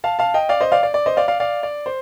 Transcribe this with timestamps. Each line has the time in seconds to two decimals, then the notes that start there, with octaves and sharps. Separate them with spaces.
0.04 F5 A5
0.19 F5 A5
0.34 D#5 G5
0.49 D5 F5
0.61 C5 D#5
0.72 D5 F5
0.83 D5
0.94 D5
1.06 C5 D#5
1.17 D5 F5
1.28 D5 F5
1.40 D5 F5
1.63 D5
1.86 C5